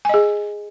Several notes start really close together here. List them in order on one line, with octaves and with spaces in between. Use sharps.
G#5 D#5 G#4